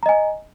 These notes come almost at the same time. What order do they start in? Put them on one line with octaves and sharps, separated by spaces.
A#5 D#5 G#5